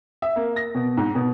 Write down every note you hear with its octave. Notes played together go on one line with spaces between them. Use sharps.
E5
A#3
A#6
B2
G#2
B2